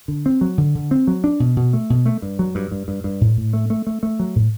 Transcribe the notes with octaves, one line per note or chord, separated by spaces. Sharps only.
D3
C4
F#3
D3
D3
C4
F#3
D4
B2
B2
A3
B2
A3
G2
F#3
G2
G2
G2
G2
A2
A2
A3
A3
A3
A3
F#3
A2